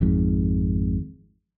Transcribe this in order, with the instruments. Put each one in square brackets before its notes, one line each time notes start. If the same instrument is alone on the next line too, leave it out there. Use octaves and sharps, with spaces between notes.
[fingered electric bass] G#1 F2 G#2